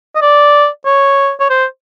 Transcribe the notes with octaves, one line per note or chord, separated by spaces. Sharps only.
D#5
D5
C#5
C#5
C5